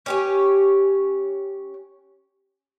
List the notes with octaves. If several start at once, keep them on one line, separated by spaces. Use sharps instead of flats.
C#4 G4 C#5